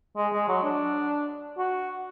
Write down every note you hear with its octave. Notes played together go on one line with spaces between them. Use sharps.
G#3
G#3
F#3
D4
F#4